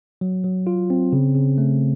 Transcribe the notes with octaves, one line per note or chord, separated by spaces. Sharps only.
F#3
F#3
F4
C4
C#3
C#3
A3